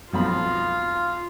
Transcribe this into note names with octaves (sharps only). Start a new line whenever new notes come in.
B1 F2 F4 B5